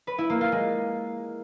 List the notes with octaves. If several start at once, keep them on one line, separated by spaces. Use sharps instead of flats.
B4
E4
A#3
F4
G#3